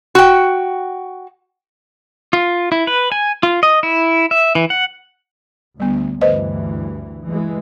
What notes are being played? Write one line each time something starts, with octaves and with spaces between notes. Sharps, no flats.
F#4 G5
F4
E4
B4
G#5
F4
D#5
E4
E5
E3
F#5
D2 G3 B3
D2 G2 E3 B4 C5 D#5
E3 G#3